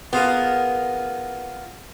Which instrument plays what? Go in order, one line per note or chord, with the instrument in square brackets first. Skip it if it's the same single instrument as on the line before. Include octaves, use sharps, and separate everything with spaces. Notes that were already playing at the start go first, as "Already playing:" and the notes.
[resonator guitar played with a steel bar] B3 [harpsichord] F4 G#4 A#4